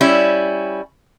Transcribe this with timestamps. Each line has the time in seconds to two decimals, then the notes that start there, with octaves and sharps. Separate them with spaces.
0.01 G3 C#4 E4